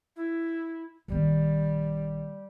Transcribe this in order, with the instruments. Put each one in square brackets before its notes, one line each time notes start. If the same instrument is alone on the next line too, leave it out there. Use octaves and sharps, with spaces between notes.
[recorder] E4
[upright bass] A#1 D#3 [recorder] G3